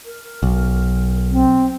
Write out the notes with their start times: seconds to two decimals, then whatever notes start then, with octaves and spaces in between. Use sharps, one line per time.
0.05 A#4
0.43 B1
1.31 C4